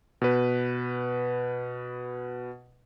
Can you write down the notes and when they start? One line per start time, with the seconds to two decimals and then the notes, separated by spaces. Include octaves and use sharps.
0.22 B2 B4